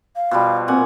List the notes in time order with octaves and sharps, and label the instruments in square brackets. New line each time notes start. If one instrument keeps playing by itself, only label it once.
[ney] F5
[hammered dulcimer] B2 F3 G3
[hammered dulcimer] A#2 F#5 G#5 [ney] C4